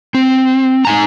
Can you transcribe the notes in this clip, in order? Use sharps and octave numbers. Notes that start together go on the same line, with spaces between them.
C4
D#4 G#5 A#5